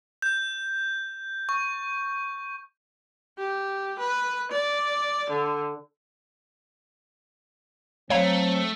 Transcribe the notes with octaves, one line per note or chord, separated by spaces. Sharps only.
G6
C#6
G4
B4
D5
D3
F#3 A3 C4 C#5 F5 A#5